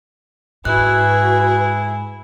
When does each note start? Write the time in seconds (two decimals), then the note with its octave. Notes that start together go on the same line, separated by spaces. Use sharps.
0.65 G#2 E4 F#4 G#4 B4 F#6